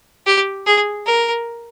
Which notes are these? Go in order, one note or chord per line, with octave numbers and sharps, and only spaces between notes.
G4
G#4
A#4